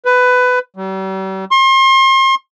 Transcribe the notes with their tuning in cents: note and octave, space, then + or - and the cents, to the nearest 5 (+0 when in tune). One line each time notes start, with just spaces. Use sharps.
B4 +15
G3 -45
C6 +40